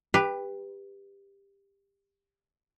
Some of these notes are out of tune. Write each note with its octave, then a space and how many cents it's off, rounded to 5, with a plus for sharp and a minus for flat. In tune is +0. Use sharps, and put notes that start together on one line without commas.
G4 +20 B4 +0